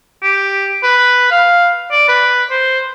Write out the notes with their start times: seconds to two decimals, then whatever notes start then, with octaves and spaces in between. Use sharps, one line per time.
0.23 G4
0.83 B4
1.31 F5
1.92 D5
2.08 B4
2.51 C5